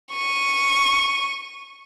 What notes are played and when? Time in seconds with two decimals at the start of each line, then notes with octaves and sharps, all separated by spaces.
0.13 C#6 D#7